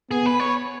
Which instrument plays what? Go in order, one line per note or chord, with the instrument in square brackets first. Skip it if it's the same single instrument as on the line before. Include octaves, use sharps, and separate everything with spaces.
[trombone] B3 [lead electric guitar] G#4
[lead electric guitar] B4
C#5